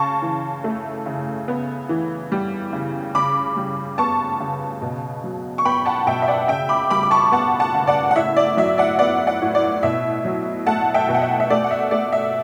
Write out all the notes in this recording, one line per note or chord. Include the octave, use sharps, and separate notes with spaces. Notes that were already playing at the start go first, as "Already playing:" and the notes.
Already playing: C#3 A5 C#6
E3
A3
C#3
B3
E3
G3
C#3
C#3 B5 D6
G3
B3 A5 C#6
C#3
B2
F#3
C#6
B3 G5 B5
F#5 A5
B2 E5 G5
E5
D5 F#5
C#3 E5 G5
B5 D6
G3 B5 D6
D6
A5 C#6
B3 F#5 A5
F#5 A5
C#3
D5 F#5
F#5
A2 E5
D5
F#3 E5
D5 F#5
B3 D5 F#5
D5 F#5
A2
D5
B2 E5
F#3
A3 F#5 A5
E5 G5
B2
F#5
E5
E5
A3 D5
F#5
E5
A3 D5
E5